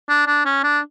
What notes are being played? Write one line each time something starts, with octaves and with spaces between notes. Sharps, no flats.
D4
D4
C#4
D4